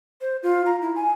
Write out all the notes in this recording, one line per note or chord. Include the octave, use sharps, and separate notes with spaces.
C5
F4
A#5
E4
G#5